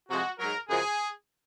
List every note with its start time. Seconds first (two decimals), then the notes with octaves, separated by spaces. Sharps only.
0.09 C3 F3 G#3 F#4
0.39 G#2 F#3 A#4
0.68 F#2 C#3 F3 G#3 G#4